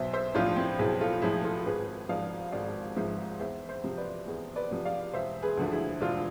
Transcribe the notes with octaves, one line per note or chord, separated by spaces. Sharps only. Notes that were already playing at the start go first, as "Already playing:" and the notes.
Already playing: B1 C5 E5
C5 E5
A2 F3 D4 F4
C4 E4
B1 E4 G#4
F4 A4
A2 F3 E4 G#4
F4 A4
G#1 G#4 B4
G#2 F3 D5 F5
G#1 D5 F5
G#2 F3 C5 E5
E2 C5 E5
C5 E5
C3 F3
B4 D5
E2 G#4 B4
B4 D5
C3 F3
D5 F5
E1 C5 E5
G#4 B4
D2 D3 F3
E4 G#4
E1 D4 F4